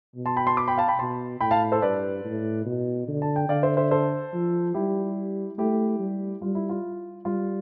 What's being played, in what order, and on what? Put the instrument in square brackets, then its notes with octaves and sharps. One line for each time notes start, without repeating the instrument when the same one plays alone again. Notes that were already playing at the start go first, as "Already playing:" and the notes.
[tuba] B2
[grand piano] A5 C6
G5 B5
A5 C6
B5 D6
G5 B5
F5 A5
G5 B5
[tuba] B2 [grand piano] A5 C6
[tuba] A2 [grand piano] G5 B5
[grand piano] F5 A5
A4 C5
[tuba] G2 [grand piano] B4 D5
[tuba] A2
B2
D3
[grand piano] A5
G5
[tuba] D3 [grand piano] D5 F5
[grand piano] C5 E5
C5 E5
A4 C5
[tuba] F3
[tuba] G3 [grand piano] E4 G4
[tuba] A3 [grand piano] E4 G4
[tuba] G3
[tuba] G3 [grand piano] F4
[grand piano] E4
F4
[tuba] G3 [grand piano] F4